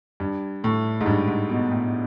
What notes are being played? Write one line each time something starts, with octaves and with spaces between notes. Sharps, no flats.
G2
A2
G#2
G2
G#2
B2
A2